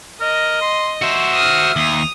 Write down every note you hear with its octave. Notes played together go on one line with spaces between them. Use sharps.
A#4 D#5
C6
F#4 C5 E5
D#6 F6
D#2 D#6 F7